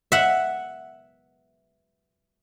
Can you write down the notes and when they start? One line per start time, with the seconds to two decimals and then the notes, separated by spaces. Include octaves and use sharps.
0.12 E5 F#5